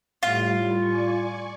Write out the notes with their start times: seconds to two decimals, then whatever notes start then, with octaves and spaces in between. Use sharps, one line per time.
0.23 A2 G3 F4
0.78 D5 G#5 C#6